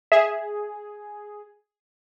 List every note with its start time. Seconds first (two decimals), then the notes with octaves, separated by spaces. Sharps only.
0.12 G#4 E5